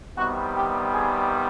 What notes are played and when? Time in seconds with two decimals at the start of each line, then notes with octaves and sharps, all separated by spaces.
0.16 C3 D#3 G3 B3 F#4
0.55 G4
0.94 G#4